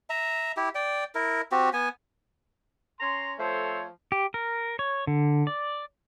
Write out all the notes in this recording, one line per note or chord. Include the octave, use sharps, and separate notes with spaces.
E5 A#5
E4 G4
D5 G5
E4 A#4
C4 F#4 G4
B3 G#5
C#4 A#5 C6
F3 A3 A4 C5 C#5
G4
A#4
C#5
D3
D5